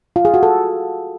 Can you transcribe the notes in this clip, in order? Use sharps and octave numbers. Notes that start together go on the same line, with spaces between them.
F4
G#4
F#4
A4